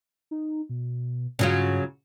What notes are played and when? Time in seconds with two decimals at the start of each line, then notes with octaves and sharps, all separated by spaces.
0.31 D#4
0.69 B2
1.39 G2 C#3 F#3 F4